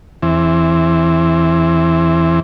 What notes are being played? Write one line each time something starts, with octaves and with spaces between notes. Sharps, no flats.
E2 E3 C4